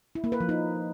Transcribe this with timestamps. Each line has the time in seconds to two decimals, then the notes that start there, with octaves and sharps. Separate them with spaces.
0.15 E4
0.24 A#3
0.32 B4
0.40 F3
0.49 D#4